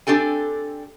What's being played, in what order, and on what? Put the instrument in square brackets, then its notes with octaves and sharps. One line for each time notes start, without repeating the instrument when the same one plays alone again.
[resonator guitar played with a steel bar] C4 D4 G4 A4 G#5